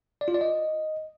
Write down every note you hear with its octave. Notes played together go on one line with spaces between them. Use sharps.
D5
F4
D5
D#5